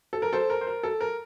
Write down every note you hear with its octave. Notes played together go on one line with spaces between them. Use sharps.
A4
A#4
A4 C5
A#4
C5
A#4
A4
A#4